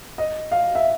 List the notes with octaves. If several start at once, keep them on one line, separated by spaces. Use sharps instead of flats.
D#5
F5
E5